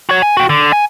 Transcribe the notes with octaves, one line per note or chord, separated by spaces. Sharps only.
F#4 C#5
G#5
F#4 G5
D3
G#5